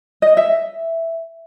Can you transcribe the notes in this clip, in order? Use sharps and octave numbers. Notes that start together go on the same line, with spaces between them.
D#5
E5